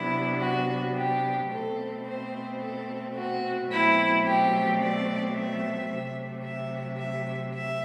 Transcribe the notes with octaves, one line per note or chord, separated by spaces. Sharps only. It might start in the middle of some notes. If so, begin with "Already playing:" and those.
Already playing: C3 F#3 B3 D4 E4
F#4
G4
B2 A3 C4 A4
C5
A4
F#4
B2 F#3 A3 C4 E4
G4
D5
E5
C3 F#3 A3
E5
E5
E5